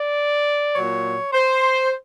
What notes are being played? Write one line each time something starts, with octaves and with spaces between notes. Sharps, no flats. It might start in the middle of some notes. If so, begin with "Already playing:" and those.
Already playing: D5
A#2 F#3 C#5
C5